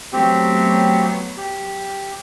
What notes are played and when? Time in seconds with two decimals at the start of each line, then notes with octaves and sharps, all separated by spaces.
0.13 F#3 A3 B3 C4 G4
1.37 G4